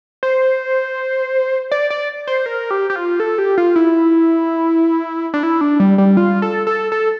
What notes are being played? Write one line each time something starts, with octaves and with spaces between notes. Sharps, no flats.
C5
D5
D5
C5
A#4
G4
G4
F4
A4
G4
F4
E4
D4
E4
D4
G3
G3
F4
A4
A4
A4